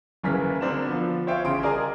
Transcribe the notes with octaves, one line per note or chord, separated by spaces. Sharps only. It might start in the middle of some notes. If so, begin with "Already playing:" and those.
F#1 C#3 E3 A#4 B4 B6
D3 C4 D4 A#4 C5 E7
F3 B3
F4 C5 C#5 E5 F5 G5
A1 C#3 C6 D7
G#4 A#4 D5 D#5 G#5 A#5